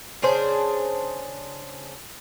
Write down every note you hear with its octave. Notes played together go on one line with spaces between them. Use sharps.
C#3 D4 G#4 C5